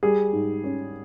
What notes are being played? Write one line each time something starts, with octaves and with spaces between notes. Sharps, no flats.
G3 G#4
G#2
C#4